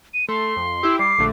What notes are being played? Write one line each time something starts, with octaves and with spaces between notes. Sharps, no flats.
D#7
A3 C6
F2
E4 G4 E6
G3 D6 C7
A#1 D3 A3